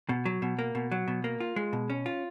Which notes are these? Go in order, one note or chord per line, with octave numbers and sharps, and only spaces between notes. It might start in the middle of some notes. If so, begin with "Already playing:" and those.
B2
F#3
B2
A#3
B2
F#3
B2
A#3
F4
G#3
B2
C#4
F4